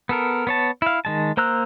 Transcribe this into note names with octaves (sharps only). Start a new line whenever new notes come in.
B3 A4 A#4
B3 C#5 A5
E4 F5
D#3 G#3 A5
A#3 C5 A#5 E6 F#6